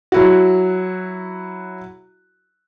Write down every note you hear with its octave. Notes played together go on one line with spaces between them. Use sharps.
F#3 E4 F#4